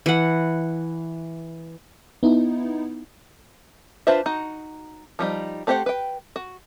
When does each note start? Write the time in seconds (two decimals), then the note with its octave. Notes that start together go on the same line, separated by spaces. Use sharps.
0.06 E3 F#5
2.23 B3 D#4 E4
4.07 D4 F4 B4 C5 E5
4.26 D#4 F#4
5.19 F3 G3 D#4
5.67 A3 C4 G4 C5 F#5
5.86 B4 G5
6.36 F#4